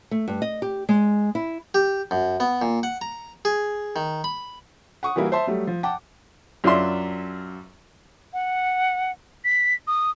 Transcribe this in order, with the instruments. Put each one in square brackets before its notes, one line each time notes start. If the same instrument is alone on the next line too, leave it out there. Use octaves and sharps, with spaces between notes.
[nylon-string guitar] A3
G2
D#5
G4
G#3
E4
[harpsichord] G4
F#2
B3
A#2
F#5
A#5
G#4
D#3
B5
[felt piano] F#5 C#6 D#6
E3 G3 A#3 E4 F#4
C5 E5 A5 C6
F#3 G3 A3
F3
F#5 G5 A5 D6
[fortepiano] F#2 F#3 D4 F4 E5 C6
[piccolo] F#5
B6
D#6